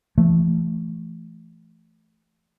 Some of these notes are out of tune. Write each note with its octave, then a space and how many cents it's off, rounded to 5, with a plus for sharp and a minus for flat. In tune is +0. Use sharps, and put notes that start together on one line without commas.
E3 +40 A3 +0